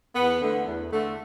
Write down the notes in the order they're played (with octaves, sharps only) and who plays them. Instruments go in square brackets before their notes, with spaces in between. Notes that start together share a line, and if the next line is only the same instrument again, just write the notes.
[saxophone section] E2 B3
D3 A3
E2
D3 A3